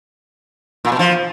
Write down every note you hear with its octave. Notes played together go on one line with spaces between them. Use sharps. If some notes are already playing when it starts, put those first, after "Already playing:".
A#2
B2
F3